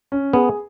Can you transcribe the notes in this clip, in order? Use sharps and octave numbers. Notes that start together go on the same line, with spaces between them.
C#4
B3 G#4